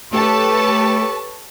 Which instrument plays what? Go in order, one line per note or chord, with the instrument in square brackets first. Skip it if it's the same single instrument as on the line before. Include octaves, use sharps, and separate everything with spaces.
[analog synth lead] A3 [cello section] G4 A4 C#5 [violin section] B4 A5 [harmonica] C#6